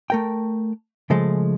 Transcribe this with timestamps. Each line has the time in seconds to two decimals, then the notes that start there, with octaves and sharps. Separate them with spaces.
0.10 A3 A#4 G5
1.10 C#3 F3 G#3 A3